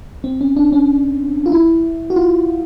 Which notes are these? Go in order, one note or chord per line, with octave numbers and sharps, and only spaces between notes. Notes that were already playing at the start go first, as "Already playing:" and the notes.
C4
C#4
D4
C#4
F4
E4
F#4
F4